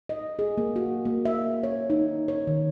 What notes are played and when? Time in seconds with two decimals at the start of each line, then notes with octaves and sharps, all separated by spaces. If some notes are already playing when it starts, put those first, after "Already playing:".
0.09 D#5
0.39 G#4
0.58 A#3
0.76 F#4
1.05 A#3
1.25 E5
1.63 C#5
1.90 D#4
2.28 C#5
2.47 D#3